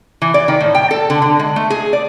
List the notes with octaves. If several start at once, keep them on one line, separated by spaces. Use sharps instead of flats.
E3
D5
D#3
A2
G5
A4
D3
D3
G#3
A3
G#4
D5